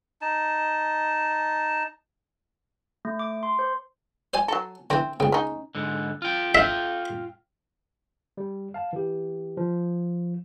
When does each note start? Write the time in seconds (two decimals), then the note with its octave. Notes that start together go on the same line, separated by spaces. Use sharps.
0.22 D#4 A5
3.05 A3
3.19 D6
3.43 C6
3.59 C5
4.34 C5 D5 G#5
4.48 F#3 A4
4.90 D3 E3 C4
5.20 C#2 C#3 G5
5.32 C#4 D#4
5.75 G#2 D3
6.22 F4 G5
6.55 F4 E5 F5 G5
8.37 G3
8.74 F5 A5
8.93 E3 G4
9.57 F3